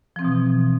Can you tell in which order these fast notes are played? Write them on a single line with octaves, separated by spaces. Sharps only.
F3 C4 E3 B2